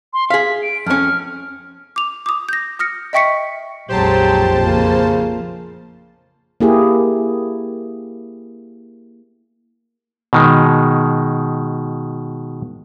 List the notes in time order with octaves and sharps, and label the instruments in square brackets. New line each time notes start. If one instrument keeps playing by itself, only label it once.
[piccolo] C6
[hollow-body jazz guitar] G#4 F5 [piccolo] B6
[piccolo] D7
[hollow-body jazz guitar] F2 C#4 [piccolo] F6
[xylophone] D6 F7
D6 D#6
G6 A#6
D#6 F6 A#6 C#7
D#5 E5 G5 C#6 B6 C#7
[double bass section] A#1 F2 [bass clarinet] F#3 [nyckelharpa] G#3 G4 [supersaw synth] C5 A5
[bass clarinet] C#3 [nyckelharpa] A#3 F4
[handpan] A#3 E4 G4 G#4
[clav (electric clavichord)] B2 D#3 G#3